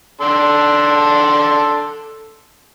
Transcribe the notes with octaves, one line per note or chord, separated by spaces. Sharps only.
D4 A4 C6